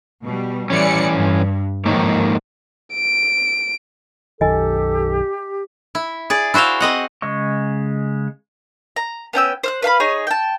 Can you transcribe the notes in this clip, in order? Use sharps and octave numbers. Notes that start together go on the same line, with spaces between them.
B2 G3
E3 G3 C#4 D5 C#7
G2
G#2 D#3 F3 A#3 C#5
D7
B1 F#2 D#3 G4 A4 D#5 G#5
E4
G#4 D5
E4 F#4 C5 E5 F5
C4 D#5 F#5
C#3 G#3 D#5 C#6
A#5
B3 C#4 G5 E6
C5 F6 F#6
B4 F5 A5 B5
D#4 G#4 C#5
G5 A5